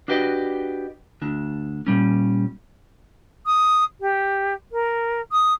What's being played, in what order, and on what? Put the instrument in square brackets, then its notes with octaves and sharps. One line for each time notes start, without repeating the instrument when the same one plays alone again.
[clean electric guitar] D4 F#4 G4 B4 D5 D#5
D2 D4
A#2 G3 C#4
[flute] D#6
G4
A#4
D#6